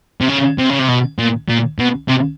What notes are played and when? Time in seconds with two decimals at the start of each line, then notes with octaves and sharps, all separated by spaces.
0.21 C3
0.29 C#3
0.59 C3
0.70 C#3
0.79 C3
0.89 B2
1.19 A#2
1.48 A#2
1.79 B2
2.08 C3